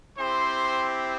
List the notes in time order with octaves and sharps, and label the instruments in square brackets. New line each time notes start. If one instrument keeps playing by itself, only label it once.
[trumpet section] C4 E4 G4 C5 C6